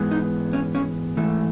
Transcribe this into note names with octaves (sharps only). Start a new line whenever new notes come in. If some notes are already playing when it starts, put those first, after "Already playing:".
Already playing: G#2 E3 G#3 B3
D#4
C#4
C#4
G#2 E3 A3